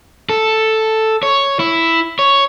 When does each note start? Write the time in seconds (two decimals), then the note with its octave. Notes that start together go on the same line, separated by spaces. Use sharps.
0.29 A4
1.23 C#5
1.60 E4
2.19 C#5